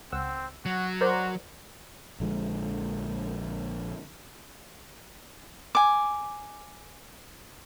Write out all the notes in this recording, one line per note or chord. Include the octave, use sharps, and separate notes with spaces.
C#2 C4 F#5 E6
F#3 F#4
F#4 A#4 C5 D5
A#1 D3 F3 G#3
G#5 D6